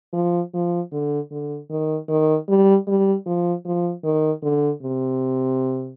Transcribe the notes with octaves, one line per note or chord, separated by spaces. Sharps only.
F3
F3
D3
D3
D#3
D#3
G3
G3
F3
F3
D#3
D3
C3